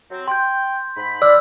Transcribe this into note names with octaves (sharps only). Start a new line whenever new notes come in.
F#3 C4
G5 C6 G6
G#2 B5
D5 E6 F6